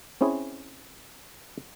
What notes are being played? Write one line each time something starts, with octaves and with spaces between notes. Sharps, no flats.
C4 C#4 E4 G#4